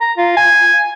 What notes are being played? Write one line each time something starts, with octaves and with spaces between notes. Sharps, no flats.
A#5
F4
G#5